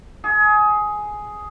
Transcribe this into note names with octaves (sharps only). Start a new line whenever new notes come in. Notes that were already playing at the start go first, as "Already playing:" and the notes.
G#4